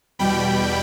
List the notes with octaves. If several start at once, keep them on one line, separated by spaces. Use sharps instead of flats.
E2 B2 G3 G5 B5